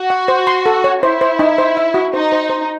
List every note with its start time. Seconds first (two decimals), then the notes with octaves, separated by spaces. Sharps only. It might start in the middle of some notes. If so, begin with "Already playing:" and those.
Already playing: F#4
0.10 F#5
0.28 C5
0.47 C6
0.66 A4
0.84 C#5
1.03 E4 C5
1.21 C5
1.39 D#4
1.58 C5
1.77 E5
1.94 F#4
2.13 D#4 C5
2.32 C5
2.50 C5